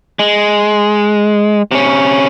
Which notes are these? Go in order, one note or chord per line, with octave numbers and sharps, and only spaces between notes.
G#3
C3 C#4